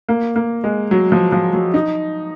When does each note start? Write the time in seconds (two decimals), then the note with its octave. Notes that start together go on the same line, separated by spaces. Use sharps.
0.09 A#3
0.36 A#3
0.64 G#3
0.91 F#3
1.12 F3
1.32 F3
1.53 F#3
1.74 D#4